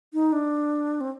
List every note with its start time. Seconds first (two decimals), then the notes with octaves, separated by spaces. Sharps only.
0.14 D#4
0.32 D4
1.01 C4